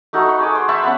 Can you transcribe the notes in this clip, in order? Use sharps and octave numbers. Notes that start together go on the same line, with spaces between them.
A3 D#4 F#4 A4
B5 C#6
G#4 D6
C5
E5 A5 B5 C#6
B3 C#4 F#5